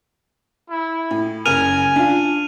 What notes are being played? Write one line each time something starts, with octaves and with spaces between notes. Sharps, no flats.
E4
A2
F#1 A#4 G#5 F6 D#7 F7
D4 F4